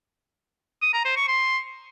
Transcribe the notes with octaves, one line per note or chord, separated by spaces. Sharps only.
D#6
A#5
C5
C#6
C6